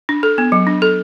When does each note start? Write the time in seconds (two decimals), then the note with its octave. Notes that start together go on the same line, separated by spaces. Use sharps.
0.09 D4
0.23 A4
0.38 B3
0.52 F#3
0.67 D4
0.82 A4